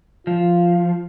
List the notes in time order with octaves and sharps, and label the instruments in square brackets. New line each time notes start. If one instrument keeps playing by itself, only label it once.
[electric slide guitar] F3 [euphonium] F4